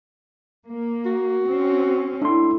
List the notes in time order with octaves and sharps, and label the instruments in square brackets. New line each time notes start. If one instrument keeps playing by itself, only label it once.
[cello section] A#3
[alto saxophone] F#4
[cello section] C4 C#4
[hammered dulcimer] A2 [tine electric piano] D4 C6